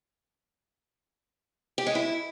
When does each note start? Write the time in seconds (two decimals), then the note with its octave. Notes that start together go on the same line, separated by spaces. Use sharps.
1.78 G4
1.87 G#3
1.95 E4